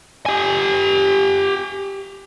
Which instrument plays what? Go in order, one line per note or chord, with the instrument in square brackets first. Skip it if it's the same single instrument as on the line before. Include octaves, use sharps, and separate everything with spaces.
[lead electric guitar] G4 G#5